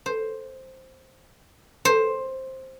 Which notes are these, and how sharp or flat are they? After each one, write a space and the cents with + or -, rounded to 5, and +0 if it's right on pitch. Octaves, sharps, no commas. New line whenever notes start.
C5 +5
C5 +10